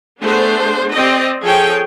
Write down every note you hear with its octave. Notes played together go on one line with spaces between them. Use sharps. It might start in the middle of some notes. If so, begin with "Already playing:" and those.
A3 B3 D4 G#4 C5
C4 G4 D5 D#5
F3 G#4 A4 C#5 G5